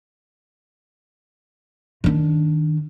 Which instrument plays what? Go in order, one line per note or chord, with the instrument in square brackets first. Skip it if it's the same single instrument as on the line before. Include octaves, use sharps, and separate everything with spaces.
[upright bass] D#3 D4